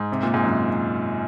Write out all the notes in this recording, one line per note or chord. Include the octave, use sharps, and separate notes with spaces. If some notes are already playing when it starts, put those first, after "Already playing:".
Already playing: G#2
C3
A#2
G#2
F#2